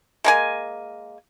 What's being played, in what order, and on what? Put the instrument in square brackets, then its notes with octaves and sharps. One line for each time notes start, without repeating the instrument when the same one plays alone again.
[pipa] G#3 A#3 G#5